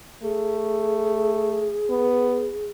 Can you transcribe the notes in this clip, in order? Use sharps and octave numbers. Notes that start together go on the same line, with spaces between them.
A3 G#4
B3